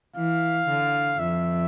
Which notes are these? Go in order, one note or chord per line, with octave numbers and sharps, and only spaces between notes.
E3 F5
D3
F2 E5